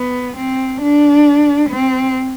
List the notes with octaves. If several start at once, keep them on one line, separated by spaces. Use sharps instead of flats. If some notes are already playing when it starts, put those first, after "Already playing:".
Already playing: B3
C4
D4
C4